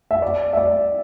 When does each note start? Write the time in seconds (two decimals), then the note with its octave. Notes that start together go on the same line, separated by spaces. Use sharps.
0.11 E5
0.22 D5
0.53 E5
0.57 D5